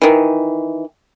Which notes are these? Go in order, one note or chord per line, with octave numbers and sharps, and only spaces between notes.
D#3 E3